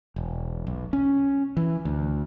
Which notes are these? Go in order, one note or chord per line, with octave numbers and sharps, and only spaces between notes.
E1
B1
C#4
E3
D2